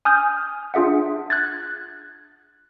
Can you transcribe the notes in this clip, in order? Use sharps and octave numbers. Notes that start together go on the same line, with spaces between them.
G#5 D#6 F6 G6
D4 F4 G#4 E5 F#5
F#6 G#6 A6